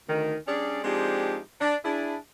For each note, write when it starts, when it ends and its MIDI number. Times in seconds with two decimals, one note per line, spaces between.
0.08 0.36 38
0.08 0.36 51
0.47 0.83 55
0.47 0.83 61
0.47 0.83 62
0.47 0.83 68
0.47 0.83 74
0.84 1.38 53
0.84 1.38 56
0.84 1.38 60
0.84 1.38 62
0.84 1.38 63
0.84 1.38 67
1.61 1.76 62
1.84 2.16 62
1.84 2.16 64
1.84 2.16 68